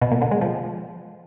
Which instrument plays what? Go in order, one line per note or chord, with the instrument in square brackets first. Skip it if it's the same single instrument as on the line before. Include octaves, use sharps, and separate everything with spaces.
[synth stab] B2
A#2
D3
G#3
F3